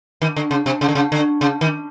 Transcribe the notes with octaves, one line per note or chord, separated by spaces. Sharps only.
D#3
D3
C#3
C3
C#3
D3
C#3
D3
C#3
D#3